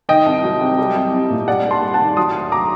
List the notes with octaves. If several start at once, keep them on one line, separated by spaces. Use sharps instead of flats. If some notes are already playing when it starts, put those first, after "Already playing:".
D#3 D#5 G5
C2
F#3
C3
G3
C2
C2
A#2
G3 D5 F#5
G2
A5 C6
G2
F#5 A5
D#3
F#3 C6 D#6
D2
A#5 D6